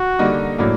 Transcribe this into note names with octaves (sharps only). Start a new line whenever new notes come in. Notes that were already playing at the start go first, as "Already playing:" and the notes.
Already playing: F#4
D3 G3 A#3 D#4
A2 F#3 A#3 D4